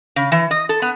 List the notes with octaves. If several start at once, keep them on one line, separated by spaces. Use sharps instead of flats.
C#3
E3
D#5
A4
B3